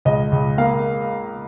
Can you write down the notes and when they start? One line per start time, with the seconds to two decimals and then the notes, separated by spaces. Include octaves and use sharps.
0.05 C#2 D#5
0.32 C#2
0.58 A#3 F5